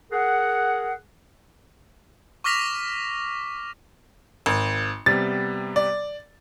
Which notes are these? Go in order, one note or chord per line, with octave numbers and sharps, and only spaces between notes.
G#4 A#4 F#5
C#6 D6 F6 A#6 B6 F7
G#1
C3 G3 B3 A6
D5